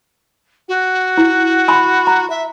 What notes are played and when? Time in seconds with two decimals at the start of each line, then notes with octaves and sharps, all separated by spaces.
0.68 F#4
1.18 E4
1.68 G#5 B5 C6
2.07 A#5
2.29 E5